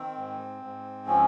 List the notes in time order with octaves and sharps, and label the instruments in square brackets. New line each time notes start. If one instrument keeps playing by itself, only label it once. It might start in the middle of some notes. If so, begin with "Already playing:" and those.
Already playing: [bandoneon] D#3 C4
G#2
G#2
F3 C#4